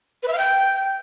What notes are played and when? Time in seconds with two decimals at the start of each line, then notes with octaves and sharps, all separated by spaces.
0.23 B4
0.28 E5
0.33 F5
0.38 G5